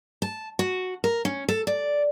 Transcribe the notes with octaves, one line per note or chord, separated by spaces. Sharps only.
A5
F#4
A#4
C#4
A4
D5